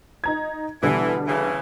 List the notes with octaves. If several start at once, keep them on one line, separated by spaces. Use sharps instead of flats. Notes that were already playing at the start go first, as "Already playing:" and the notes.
D#4 A#5 G#6
B2 D3 E3 G3
C#3 E3